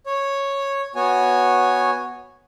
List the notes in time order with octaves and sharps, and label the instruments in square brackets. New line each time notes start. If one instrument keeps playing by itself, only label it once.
[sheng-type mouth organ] C#5
B3 F#4 C#5 G#5